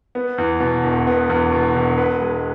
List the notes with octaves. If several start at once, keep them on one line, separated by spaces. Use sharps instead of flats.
B3
E2
B2
E1
B3
E2
B2
E1
B4
G#3